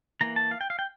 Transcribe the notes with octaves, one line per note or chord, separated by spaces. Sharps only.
E3 A#3 A#5
A5
F5
G5
F5
G5